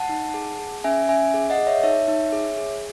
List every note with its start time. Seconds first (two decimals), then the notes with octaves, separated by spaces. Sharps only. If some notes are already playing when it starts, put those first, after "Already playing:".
Already playing: F#5 A5
0.09 D#4
0.34 G#4
0.59 G#4
0.84 C#4 E5 G#5
1.09 C#4 E5 G#5
1.34 G#4
1.50 D#5 F#5
1.58 G#4
1.67 C#5 E5
1.83 D#4 C#5 E5
2.08 D#4
2.32 G#4
2.58 G#4